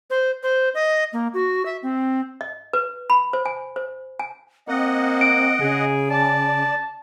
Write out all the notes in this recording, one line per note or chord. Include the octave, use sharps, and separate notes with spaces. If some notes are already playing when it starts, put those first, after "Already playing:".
C5
C5
D#5
A#3
F#4
E5
C4
D#5
B4
B5
C5
G#5
C5
G#5
A#3 C4 D#5 F#5
D7
C#3 G#4
D5 A5